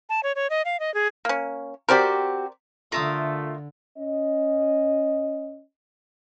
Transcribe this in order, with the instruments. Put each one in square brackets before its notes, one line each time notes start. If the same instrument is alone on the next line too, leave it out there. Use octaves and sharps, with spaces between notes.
[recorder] A5
C#5
C#5
D#5
F5
D#5
G#4
[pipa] A#3 C#4
[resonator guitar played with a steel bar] C4 F#4 G4 [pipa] A#4 C5 D5
[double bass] D3 [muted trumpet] A3 [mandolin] F4 [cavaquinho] A#4 E5 D#6
[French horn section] C#4 D#5